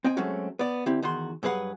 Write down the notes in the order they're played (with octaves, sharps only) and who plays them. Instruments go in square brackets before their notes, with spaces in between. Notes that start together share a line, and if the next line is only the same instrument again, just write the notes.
[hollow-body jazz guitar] C4 D#5 G5 G#5
F#3 G#3 A3 C4 C#4 F#4
B3 D5
D3 C4 E4 G4
E2 D#3 F#4 C6
G2 F#3 G#4 B4 F5 F#5